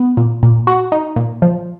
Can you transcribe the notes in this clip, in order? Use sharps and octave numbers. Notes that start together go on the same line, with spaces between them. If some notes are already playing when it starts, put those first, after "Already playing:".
Already playing: B3
A#2
A#2
F#4
D#4
A#2
F3